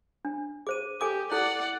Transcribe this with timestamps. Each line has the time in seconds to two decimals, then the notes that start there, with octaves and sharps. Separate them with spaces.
0.25 D4
0.67 G#4 C5 D6 D#7
1.01 G4 A4 G#5 D6 D#6
1.32 E4 A4 D5 F#5 F#6